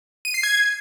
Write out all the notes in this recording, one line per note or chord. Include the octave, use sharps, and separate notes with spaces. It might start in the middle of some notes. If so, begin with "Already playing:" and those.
D#7
C7
G#6